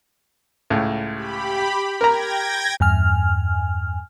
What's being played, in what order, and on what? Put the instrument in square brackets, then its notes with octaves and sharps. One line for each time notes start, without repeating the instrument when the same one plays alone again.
[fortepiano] C#2 A2
[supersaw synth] G4 B5
[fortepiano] A#4 A#5 [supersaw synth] G5 G#6 A#6
[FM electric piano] E2 G2 G#5 F6